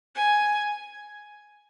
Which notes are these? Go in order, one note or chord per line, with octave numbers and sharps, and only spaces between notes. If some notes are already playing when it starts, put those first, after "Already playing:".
G#5